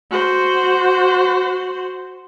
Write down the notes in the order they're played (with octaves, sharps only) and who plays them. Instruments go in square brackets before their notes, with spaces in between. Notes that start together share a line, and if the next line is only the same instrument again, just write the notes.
[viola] F#4 C5